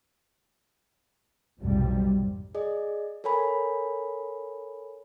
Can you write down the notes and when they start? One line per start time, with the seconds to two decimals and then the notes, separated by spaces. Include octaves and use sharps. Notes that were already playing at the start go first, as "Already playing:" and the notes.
1.60 B1 F2 G#2 C3 G3
2.55 G#4 D5 D#5
3.24 A4 A#4 C#5 G#5 B5